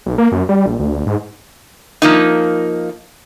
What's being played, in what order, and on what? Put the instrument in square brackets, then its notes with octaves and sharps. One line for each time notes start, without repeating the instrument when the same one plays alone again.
[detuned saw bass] B1
A#3
F#2
G3
A#1
D2
D2
G#2
[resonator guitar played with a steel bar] F3 A#3 D#4